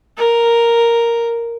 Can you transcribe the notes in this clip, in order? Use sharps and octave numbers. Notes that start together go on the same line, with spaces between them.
A#4